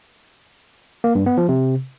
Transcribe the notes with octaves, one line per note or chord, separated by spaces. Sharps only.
A#3
G2
B3
F3
C3